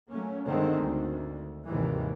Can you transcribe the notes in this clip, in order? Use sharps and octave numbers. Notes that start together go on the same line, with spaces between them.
F#3 A3 A#3 C#4
G1 D3 D#3 G#3 A3 C4
D2
G#1 D#2 G#2 C3 D#3 E3